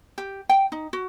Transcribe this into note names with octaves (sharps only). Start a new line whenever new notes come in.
G4
G5
D#4
F#4